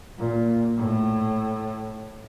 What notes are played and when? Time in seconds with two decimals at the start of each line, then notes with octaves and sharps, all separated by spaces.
0.19 A#2
0.77 A2